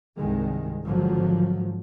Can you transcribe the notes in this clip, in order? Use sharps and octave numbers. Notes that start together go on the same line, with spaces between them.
C2 G2 D#3 G#3
G#1 D3 F3 F#3